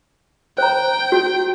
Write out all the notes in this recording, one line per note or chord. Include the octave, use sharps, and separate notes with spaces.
C5 G5 A#5
F#4